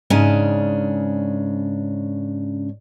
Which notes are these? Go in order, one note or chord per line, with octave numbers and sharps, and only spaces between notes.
G#2 C#3 C#4 D4